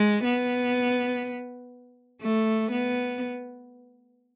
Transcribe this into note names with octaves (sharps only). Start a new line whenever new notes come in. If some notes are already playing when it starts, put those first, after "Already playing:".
Already playing: G#3
B3
A3
B3